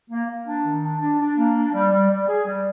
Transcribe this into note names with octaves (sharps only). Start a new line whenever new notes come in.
A#3
A#3
D4
D#3
D4
D4
D4
A#3
D4
G3
G3
G3
G#4
G3